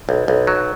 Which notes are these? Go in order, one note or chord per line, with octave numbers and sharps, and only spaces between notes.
B1
B1
F#3